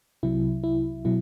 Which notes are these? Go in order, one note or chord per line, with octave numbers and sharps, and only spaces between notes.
C2 C3 F#3 E4
E4
B2 F#3 E4